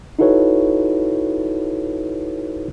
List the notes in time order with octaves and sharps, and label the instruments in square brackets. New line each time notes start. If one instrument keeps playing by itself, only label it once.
[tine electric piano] D#4 E4 F#4 A4 B4 C#5